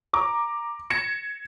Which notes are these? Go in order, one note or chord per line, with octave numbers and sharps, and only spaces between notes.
A#5 D6
G#6 A#6 C#7 E7